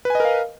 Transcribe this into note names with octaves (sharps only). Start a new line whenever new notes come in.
A#4 B4 D#5 F5 G#5